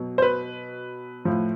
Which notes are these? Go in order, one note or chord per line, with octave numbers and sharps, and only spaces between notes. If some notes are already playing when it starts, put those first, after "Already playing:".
Already playing: B2 F#3
C5
B4
A2 F3